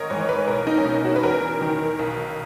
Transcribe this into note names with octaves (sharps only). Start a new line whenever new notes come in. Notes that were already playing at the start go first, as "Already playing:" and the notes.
Already playing: G#1 A#4 C#5 D#5
G#2 E3 C#5
B4
B1 A#4
D#4
C#4
B2 D#4
F#4
B4
E2 A#4
D#3
B1